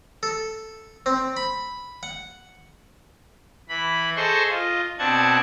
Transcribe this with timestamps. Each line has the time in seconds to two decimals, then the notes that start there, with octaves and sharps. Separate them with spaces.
0.23 A4
1.06 C4
1.37 B5
2.03 F#5
3.69 E3 B5
4.16 G#4 A4 C5 D#5 C6 C#6
4.49 F4 D#5
4.98 B2 C4 D4 F#5 A5 G#6